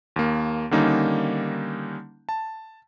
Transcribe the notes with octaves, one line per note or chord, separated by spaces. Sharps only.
D#2 A#3
D3 D#3 G3 A#3 C#4 D#4
A5